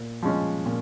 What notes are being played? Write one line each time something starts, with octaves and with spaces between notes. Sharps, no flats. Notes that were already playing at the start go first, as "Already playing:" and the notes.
Already playing: A#2
F3 G#3 C#4
A#2